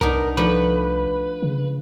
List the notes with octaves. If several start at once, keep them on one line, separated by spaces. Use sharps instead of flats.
C2 B3 D4 D#4 A#4
F3 A3 D4 B4
C#3